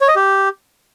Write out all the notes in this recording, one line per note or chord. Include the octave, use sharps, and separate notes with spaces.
C#5
D#5
G4